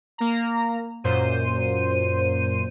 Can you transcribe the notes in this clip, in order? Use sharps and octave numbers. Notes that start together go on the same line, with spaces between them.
A#3 A#5
F#2 A#2 C5 D#7